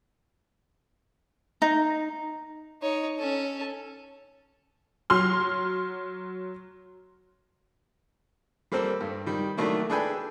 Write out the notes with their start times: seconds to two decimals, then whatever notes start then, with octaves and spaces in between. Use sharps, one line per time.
1.62 D#4
2.82 D#4 C#5
3.19 C#4 A4
5.10 F#3 C6 F6
8.72 G3 A#3 C4 A4 C5
9.01 G2
9.26 D#3 G3
9.57 D#3 F#3 A3 A#3 D4 E4
9.90 D4 G#4 A4 B4 G5 G#5